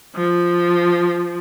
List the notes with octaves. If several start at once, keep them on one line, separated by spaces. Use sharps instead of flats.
F3